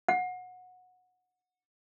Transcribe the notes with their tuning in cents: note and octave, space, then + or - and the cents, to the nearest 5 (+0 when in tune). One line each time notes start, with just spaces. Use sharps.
F#5 -20